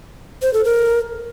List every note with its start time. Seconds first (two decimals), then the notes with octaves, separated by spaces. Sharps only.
0.42 C5
0.53 A4
0.64 A#4